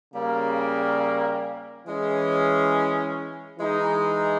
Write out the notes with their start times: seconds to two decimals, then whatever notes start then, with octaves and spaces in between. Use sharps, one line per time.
0.14 C#3 G3 A#3
1.87 E3 G#3 C#4
3.59 E3 G#3 D#4